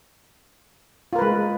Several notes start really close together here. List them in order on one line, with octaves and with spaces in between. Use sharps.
F4 A#4 B4 G#3